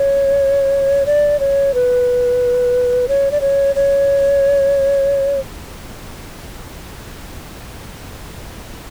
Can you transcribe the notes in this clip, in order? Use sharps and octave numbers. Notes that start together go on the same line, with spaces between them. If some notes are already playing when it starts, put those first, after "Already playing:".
Already playing: C#5
D5
C#5
B4
C#5
D5
C#5
C#5